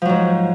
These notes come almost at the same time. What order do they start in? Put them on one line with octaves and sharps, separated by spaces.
F3 F#3 G#2